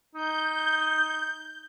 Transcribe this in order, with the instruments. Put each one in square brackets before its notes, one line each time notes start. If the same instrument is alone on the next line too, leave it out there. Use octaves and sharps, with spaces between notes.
[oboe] D#4 [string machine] G6